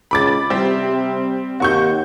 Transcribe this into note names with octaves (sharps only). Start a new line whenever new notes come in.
C#2 B5 D6 A6
C3 G3 C4
D#2 F#4 C#6 G6